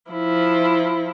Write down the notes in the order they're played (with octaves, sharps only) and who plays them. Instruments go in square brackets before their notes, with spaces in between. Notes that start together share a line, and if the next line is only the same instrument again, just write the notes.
[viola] F3 E4